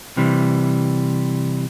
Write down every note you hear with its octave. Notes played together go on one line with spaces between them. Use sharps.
C3 E3 G3